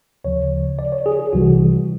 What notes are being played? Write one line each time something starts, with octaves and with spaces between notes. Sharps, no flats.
D2 C#3 F3 C#5
D5
C#5
G#4
G#4
C2 C3 E3 G3 F#4